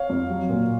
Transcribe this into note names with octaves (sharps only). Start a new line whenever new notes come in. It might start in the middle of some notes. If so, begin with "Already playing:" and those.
Already playing: C#5 F5
F2
F#3
A#2